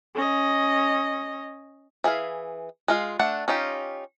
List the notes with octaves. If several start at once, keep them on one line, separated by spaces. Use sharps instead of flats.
C#4 D#5
E3 G#4 E5 F5
G#3 F4 F5
A3 D4 F#5
C#4 D#4 F4 G4